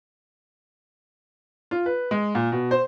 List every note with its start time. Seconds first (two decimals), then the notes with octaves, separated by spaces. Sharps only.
1.71 F4
1.86 B4
2.11 G#3
2.35 A#2
2.52 B2
2.71 C5